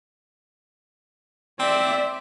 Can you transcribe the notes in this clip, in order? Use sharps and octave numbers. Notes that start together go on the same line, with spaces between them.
C4 D5 E5